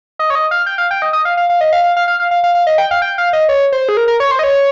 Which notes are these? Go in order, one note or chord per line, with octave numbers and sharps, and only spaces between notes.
D#5
C#5
D#5
F5
G5
F5
G5
D#5
D#5
F5
F5
F5
D#5
F5
F5
F5
F5
F5
F5
F5
F5
D#5
G5
F5
G5
F5
D#5
C#5
C5
G#4
A#4
A#4
C#5
C5
D#5
C#5